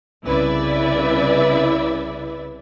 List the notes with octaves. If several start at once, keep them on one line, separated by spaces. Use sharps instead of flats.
C2 C#3 E4 B4 D5 E5